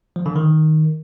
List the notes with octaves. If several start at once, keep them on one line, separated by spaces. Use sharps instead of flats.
F3
D3
D#3